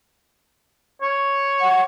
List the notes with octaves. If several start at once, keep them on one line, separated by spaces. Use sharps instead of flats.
C#5
F#5